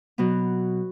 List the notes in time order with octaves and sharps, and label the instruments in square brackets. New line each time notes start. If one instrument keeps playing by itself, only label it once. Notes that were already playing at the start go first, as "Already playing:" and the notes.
[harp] B2 F#3 B3